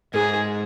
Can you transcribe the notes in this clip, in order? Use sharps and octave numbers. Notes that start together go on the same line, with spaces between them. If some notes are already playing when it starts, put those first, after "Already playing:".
G#2 G#4